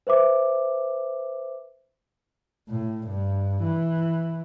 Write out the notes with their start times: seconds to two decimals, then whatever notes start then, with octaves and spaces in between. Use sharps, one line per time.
0.07 B4 C5 E5 D6
2.69 A2
3.06 G2
3.63 E3